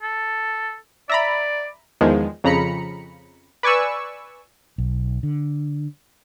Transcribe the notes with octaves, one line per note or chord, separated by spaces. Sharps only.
A4
D5 E5 A#5 B5
E2 D#3 F3 G#3
F2 C#3 A#5 B5 C#7
B4 D5 G#5 C#6 E6
B1
D3